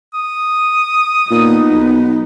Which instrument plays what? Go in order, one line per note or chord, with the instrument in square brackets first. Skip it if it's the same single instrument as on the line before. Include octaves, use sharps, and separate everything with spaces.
[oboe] D#6
[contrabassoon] A#2 [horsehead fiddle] B3 D#4
[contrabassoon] B1